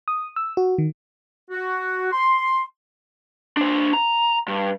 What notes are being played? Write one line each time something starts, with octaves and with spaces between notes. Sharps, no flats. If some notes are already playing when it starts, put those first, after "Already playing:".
D#6
E6
F#4
D#3
F#4
C6
D4 C5
A#5
G2